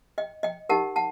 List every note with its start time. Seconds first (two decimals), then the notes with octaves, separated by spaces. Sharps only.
0.18 D#5 G5
0.43 D#5 G5
0.69 D#4 G4 A#4 F#5 A5
0.96 F#5 A5